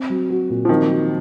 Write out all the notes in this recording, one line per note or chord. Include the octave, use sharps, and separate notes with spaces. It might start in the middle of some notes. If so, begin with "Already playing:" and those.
Already playing: C4
F#3
F#4
A#2
F3
D#3 C4
F#3